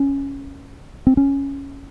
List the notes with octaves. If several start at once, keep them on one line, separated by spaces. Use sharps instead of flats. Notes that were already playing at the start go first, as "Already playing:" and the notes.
Already playing: C#4
C4
C#4